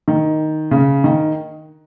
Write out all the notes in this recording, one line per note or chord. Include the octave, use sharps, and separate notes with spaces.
D#3
C#3
D#3